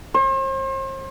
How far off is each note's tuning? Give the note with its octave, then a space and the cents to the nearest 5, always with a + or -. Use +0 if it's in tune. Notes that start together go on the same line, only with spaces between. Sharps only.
C5 +40